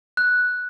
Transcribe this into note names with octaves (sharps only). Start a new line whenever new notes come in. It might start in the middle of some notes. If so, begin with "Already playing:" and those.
F#6